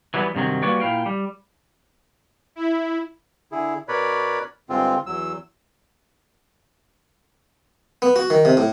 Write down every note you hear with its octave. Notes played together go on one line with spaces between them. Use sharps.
E3 F#3 G3 A#3 B3
G2 C3 D#3 F#3
G3 A#3 F#4 B4 C#5 D5
A#2 E4 F5 G5
G3
E4
D3 E4 G#4
B2 A#4 B4 C#5 D5 B5
G2 D3 G#3 C4 F4
E2 F#3 E6
B3
F#4
D#3
C3
A2